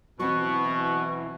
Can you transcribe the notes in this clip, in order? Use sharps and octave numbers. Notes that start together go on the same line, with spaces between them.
B2 E3 F#3 C4 C#6